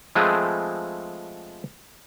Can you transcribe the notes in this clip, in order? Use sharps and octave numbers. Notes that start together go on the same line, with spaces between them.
F3 G#3 A3 C4 G#4 B4